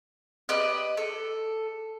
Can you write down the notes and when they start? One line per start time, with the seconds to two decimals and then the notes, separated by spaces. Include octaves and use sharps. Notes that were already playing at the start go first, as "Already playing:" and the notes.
0.49 G4 B4 D5 D#5
0.97 A4